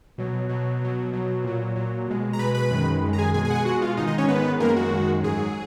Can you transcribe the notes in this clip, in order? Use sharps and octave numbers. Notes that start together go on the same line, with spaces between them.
B2 F#3
B2 F#3
B2 F#3
B2 F#3
A#2 F#3
A#2 F#3
B2 G#3
A#5
B2 G#3 B4 B5
B4 B5
F#2 D#3 G#3
F#2 D#3 G#3
A#5
G#4 G#5
B2 G#3 G#4 G#5
G#4 G#5
F#5
G#4 G#5
B2 G#3 F#4 F#5
F4 F5
G#2 D#3 G#3 D#4 D#5
D#4 D#5
C#4 C#5
G#2 D#3 G#3 B3 B4
F#2 D#3 G#3 A#3 A#4
F#4
F#2 D#3 G#3
G#2 F#3 G#4